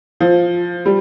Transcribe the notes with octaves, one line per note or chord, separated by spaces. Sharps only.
F3
G3